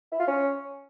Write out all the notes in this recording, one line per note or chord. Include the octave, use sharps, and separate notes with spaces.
E4
F4
C#4